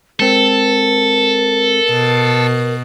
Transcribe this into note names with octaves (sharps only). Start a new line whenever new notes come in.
G#3 C4 A4 A#4
B2